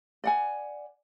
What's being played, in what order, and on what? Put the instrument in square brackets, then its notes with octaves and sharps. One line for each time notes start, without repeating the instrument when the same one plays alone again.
[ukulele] D5 F#5 G#5